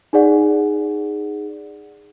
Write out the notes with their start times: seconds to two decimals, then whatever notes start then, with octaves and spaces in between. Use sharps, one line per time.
0.13 D#4 G#4 D5 F#5